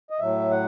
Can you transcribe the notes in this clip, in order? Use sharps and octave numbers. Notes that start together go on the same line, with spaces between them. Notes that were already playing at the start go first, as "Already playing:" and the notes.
D#5
A2 F#3 E5
F#5